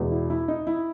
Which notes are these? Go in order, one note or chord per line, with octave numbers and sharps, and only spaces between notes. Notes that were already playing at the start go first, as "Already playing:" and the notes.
Already playing: E2 B2 G#3
E4
E4
D#4
E4